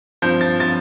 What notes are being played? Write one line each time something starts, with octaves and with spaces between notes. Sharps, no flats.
G2 F3 C4 G6
A6
F3 C4 A6